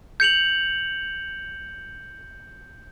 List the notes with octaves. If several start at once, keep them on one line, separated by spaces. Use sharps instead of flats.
G6 C#7 F7 F#7